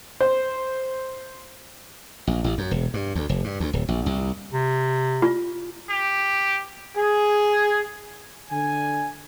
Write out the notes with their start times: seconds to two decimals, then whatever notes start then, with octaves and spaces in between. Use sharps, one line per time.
0.21 C5
2.27 A#1
2.44 A1
2.58 F#2
2.71 E1
2.94 G2
3.15 D2
3.29 F1
3.44 G2
3.60 D2
3.73 D1
3.88 A#1
4.06 C2
4.53 C3
5.22 F4
5.90 G4
6.97 G#4
8.51 D3 G#5